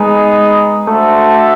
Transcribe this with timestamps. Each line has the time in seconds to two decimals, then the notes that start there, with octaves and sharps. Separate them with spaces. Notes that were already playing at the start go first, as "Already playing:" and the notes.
Already playing: G#3 B3 D#4 G#4
0.87 A3 D4 F#4 A4 C5 E5